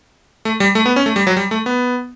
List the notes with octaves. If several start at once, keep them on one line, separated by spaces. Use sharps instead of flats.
A3
G3
A3
B3
C#4
A3
G3
F#3
G3
A3
B3